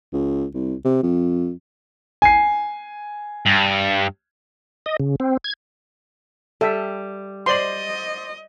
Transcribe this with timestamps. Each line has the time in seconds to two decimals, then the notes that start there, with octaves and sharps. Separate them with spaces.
0.13 C#2
0.54 C2
0.85 C3
1.03 F2
2.22 G#5 C7
3.46 G2
4.86 D#5
5.00 C#3
5.20 C4
5.44 G#6
6.61 G3 A4 E5
7.46 C5 D5 D#5 C6 F#7